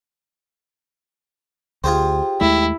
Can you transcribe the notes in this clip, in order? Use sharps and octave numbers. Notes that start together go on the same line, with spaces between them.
D2 F4 G4 G#4 C5 G5
D#2 G#3 A3 E4